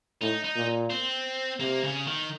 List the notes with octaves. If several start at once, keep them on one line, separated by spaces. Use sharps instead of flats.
A2 D#4
D#4
A#2
C4
C3 A#3
C#3
D#3